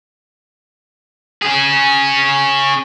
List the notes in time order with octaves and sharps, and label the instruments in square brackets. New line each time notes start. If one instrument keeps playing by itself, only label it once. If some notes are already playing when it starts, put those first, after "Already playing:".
[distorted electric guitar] C#4 G#4